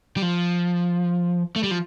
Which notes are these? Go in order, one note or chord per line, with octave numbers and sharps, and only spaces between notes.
G3
F3
A3
G3
F3